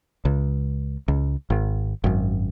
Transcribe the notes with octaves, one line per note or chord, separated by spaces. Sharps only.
C#2
C#2
G#1
G#1 F#2